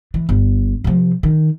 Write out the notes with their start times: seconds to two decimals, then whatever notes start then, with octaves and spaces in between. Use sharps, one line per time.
0.14 E3
0.29 G1
0.84 C3 F3
1.23 D#3